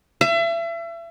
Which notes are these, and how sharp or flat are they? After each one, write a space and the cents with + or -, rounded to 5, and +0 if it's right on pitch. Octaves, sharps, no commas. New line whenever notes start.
E5 +35